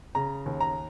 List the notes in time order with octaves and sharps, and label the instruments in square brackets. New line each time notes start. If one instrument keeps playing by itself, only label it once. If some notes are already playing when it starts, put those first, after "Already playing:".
[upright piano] C#3 A#5
D#2
A#5